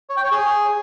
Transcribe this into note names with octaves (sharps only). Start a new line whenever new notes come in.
C#5
G5
C#5
G#4